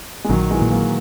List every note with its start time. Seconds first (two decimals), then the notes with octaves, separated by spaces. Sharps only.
0.24 G#3
0.29 A#1 D#3 F#3
0.51 E3 G#3
0.61 A#2
0.72 F#3 A#3